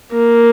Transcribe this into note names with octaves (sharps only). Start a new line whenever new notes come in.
A#3